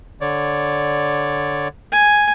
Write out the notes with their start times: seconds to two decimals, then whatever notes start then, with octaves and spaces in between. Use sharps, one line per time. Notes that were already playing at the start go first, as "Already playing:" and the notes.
0.21 D3 C#5 D5
1.92 G#5